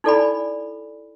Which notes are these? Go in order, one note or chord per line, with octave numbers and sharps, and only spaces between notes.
D#4 E4 A4 D5 G#5 B5